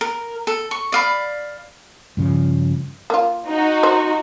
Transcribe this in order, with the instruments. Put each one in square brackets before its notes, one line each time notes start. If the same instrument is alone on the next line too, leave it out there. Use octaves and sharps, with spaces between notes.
[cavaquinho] A#4
A4
C#6
D5 F5 B5
[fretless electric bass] G2 C#3 F3
[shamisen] A#3 F4
[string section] D#4 F#4
[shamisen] C5